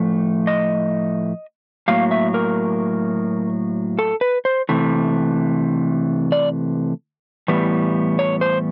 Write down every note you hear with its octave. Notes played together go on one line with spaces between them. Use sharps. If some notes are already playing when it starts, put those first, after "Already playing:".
Already playing: A2 F3 A3
D#5
A2 F#3 A#3 F5
E5
A#4
A4
B4
C5
C3 E3 A3
D5
A2 E3 G3 B3
C#5
C5